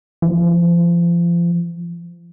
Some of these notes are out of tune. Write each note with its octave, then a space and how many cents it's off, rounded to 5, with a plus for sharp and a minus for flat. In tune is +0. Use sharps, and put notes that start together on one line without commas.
F3 -30